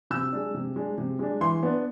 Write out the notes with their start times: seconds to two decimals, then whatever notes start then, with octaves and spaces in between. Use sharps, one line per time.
0.11 C3 E6
0.32 G#3 D4
0.54 C3
0.76 G#3 D4
0.98 C3
1.19 G#3 D4
1.41 E3 C6
1.63 B3 D4